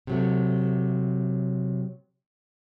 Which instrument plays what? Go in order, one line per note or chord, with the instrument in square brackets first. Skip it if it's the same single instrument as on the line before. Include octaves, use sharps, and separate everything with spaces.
[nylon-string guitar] C3 F#3 A3